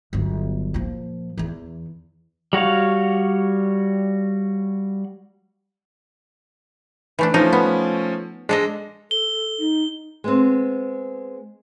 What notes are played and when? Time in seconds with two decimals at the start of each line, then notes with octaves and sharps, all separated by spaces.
0.13 G1 F#3
0.74 A#2 F3
1.38 E2 E3
2.53 G3 F#4 C#5 F5
7.19 E3 A3 D4
7.34 F3 A3 C#4 D#4
7.53 B3
8.49 G#3 D4 A4 D#5
9.11 A4 G7
9.59 D#4
10.24 G#3 B3 C4